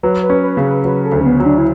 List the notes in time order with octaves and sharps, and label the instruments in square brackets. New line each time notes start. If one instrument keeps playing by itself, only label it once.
[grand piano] F#3 [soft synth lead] B4
[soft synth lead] B4
[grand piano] C#4
[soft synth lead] B4
[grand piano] C#3
[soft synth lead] B4
[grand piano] F#3 [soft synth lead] B4
[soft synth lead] A4
[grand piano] D2
[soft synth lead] C#4
B3
[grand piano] F#3
[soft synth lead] D4
E4